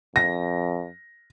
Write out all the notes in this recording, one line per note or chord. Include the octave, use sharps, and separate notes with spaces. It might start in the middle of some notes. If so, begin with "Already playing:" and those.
F2 A#6